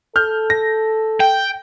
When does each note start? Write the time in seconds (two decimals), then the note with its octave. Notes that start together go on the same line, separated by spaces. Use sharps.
0.16 A4 F6 G6
0.50 A#6
1.20 G5